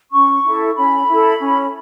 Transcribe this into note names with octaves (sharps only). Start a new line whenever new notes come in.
C#4 C#6
E4 A4
C#4 B5
E4 A4
C#4